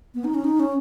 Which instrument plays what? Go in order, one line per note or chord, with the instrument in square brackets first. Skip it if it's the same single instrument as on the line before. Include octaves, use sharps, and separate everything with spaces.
[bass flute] B3
D#4
C#4
D#4
C#4